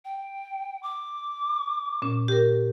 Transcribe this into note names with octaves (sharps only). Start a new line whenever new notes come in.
G5
D6
A#2 C#4
G4 A#4